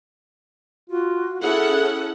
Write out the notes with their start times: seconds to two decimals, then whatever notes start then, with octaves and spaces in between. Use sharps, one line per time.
0.90 F4 F#4
1.42 C#4 E4 G#4 A4 F#5